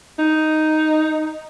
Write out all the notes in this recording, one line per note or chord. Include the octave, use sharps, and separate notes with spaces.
D#4